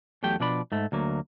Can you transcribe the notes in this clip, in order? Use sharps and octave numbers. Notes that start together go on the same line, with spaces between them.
E2 F#3 A3 G4 G5
B2 F3 D4 D5 B5
G#2 A3
D2 F#3 A#3